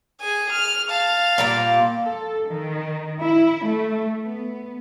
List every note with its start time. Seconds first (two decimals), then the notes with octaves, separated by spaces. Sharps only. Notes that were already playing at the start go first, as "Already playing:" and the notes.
0.21 G#4 G#5
0.51 F6
0.89 F5 A5
1.38 A#2 G3 A#3
2.02 A4
2.48 D#3
3.22 E4
3.64 A3
4.26 B3